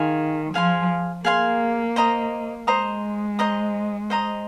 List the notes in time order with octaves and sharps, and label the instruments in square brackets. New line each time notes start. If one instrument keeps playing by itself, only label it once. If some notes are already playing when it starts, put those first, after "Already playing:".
Already playing: [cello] D#3 [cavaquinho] G#4 F5 G#5 C6
[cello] F3 [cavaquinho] G#4 F5 G#5 C6
[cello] A#3 [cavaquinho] G#4 F5 G#5 C6
[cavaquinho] C5 D#5 A#5 D#6
[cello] G#3 [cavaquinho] C5 D#5 A#5 D#6
[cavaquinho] C5 D#5 A#5 D#6
C5 D#5 A#5 D#6